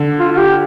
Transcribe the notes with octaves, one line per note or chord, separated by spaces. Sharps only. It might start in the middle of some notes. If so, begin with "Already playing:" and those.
Already playing: D3
F4
F4
G4